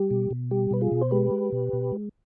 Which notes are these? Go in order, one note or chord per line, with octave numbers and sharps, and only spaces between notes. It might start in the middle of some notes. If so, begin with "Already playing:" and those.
Already playing: G3 G4
B2
B2
G3 G4
B2 B4
F4 G#4
B2
C5
G#3 G4 B4
G#3
B2
B2
G#3